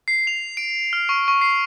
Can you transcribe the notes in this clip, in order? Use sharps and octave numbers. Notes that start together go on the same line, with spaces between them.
C7
F7
D7
F6
C#6
C#6
C7